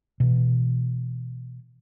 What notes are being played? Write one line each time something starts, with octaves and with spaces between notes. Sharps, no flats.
B2 E3